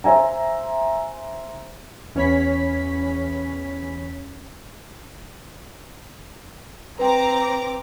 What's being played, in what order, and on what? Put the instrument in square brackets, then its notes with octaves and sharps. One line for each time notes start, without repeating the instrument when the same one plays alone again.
[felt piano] C5 E5 G#5 A#5
[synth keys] E2 C#4 C#5 B5 B6
[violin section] C4 A#5 D6 [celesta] B4 G5